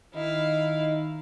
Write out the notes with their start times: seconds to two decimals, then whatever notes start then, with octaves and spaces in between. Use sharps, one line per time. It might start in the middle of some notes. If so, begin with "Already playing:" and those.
0.14 D#3 D#4 E4 F5